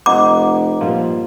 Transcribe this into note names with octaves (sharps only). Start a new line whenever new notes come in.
F1 D#5 F#5 A#5 D6
G2 A#2 F3